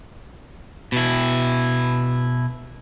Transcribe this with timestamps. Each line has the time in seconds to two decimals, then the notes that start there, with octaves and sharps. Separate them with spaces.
0.92 B2 E4